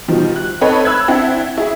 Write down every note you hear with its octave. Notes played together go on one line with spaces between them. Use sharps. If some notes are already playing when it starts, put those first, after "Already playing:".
B2 D#3 F3 G3
F#6
C4 D#4 A4 B4 C#5
B5 E6 F#6 G#6
C4 D4 E4 F#5
E4 G#4